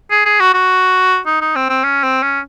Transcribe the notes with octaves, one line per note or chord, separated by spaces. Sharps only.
G#4
G#4
F#4
F#4
D#4
D#4
C4
C4
C#4
C4
C#4